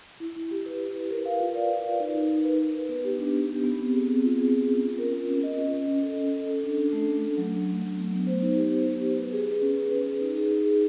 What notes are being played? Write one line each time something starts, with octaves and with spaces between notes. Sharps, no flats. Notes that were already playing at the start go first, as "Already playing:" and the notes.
E4
E4
G4
B4
E4
B4
A#4
F5
F4
D5
F5
A#4
D#4
D#4
D#4
B4
B4
D#4
B3
G4
D4
B3
G4
B3
C4
G#4
C4
F4
G#4
F4
C#4
F4
A#4
F4
C#4
D#5
C#4
C#4
C#4
A4
C#4
C#4
A4
D4
D4
A3
D4
A3
F#3
D4
F#3
F#3
B3
B3
C5
D#4
G4
G4
D#4
G4
B4
G#4
B4
C#4
C#4
B4
G#4
D#4
G#4
D#4
G#4